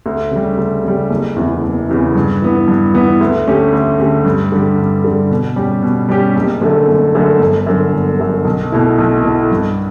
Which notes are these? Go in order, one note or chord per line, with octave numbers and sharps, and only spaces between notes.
D2
C#3 G3
D2
C#3 G3
F#1
E2 C#3 E3
F#1
E2 C#3 E3
G2
E3 B3
G2
E3 B3
D2
D3 A3 C#4 G4
D2
D3 A3 C#4 G4
G2
D3 G3
G2
D3 G3
B2
G3 C#4 G4
B2
G3 C#4 G4
F#1
F#2 D3 A3
F#1
F#2 D3 A3
G1
F#2 D3
G1
F#2 D3
B1
B2 A3 E4
B1
B2 A3 E4
G2